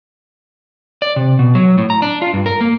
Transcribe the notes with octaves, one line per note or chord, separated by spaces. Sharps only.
D5
C3
B2
F#3
A2
A#5
D4
F4
G2
A#4
A#3